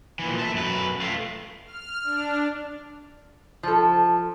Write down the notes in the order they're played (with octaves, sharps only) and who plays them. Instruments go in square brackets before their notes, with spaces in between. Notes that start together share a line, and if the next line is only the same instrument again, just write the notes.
[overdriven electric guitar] A#2 E3
E5 A5
F#2 B4
A3 F4
[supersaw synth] F6
D4
[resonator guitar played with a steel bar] F3 A4